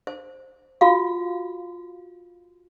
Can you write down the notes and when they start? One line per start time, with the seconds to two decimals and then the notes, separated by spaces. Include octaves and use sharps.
0.07 C5
0.81 F4 F#4 F5